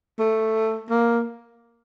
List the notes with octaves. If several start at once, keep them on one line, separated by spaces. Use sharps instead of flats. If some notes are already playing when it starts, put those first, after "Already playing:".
A3
A#3